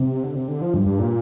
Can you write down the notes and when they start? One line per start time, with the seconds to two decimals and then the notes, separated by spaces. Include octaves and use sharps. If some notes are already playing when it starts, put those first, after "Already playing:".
Already playing: C3
0.23 D3
0.36 C3
0.48 D3
0.62 F3
0.74 G2
0.86 G2
0.99 A#2